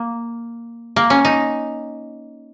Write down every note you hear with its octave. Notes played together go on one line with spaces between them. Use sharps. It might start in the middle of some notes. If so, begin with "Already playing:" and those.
Already playing: A#3
A#3
C#4
D#4